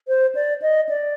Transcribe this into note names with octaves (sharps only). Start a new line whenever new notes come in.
C5
D5
D#5
D5